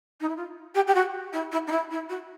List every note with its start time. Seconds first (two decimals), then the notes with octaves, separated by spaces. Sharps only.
0.20 D#4
0.28 E4
0.36 F4
0.74 G4
0.87 G4
0.94 F#4
1.32 E4
1.51 E4
1.67 D#4
1.71 E4
1.90 E4
2.09 F#4